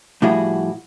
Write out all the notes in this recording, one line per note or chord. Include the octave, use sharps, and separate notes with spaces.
A2 F3 G3 E4 F#4 G#4